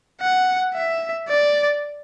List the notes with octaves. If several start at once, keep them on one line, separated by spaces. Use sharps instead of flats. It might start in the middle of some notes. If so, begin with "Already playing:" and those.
F#5
E5
D5